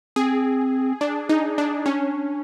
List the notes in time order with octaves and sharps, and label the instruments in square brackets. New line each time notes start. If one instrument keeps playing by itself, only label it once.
[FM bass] C4 [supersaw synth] G#4
[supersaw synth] D4
D#4
D4
[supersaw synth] C#4 [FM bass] D4